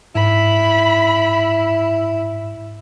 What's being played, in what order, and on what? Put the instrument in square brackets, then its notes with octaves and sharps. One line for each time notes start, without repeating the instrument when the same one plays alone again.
[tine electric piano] G#2 [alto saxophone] E4 [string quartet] B5